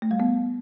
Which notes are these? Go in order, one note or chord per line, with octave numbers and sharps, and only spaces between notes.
A3
G3
B3